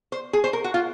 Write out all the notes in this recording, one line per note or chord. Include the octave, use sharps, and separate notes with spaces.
C5
G#4
C5
A#4
F#4
F4